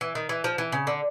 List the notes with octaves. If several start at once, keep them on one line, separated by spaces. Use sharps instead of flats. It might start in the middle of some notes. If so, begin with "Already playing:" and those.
E3
D#3
E3
F3
E3
C#3
D3